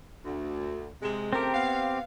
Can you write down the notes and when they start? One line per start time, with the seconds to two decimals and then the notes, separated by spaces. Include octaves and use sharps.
0.24 D2
1.01 C3 G#3
1.33 C#3 A3 C4 G4 A#4
1.54 B3 F5